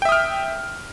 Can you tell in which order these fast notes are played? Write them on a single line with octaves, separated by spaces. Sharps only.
G5 E5 D#6 F6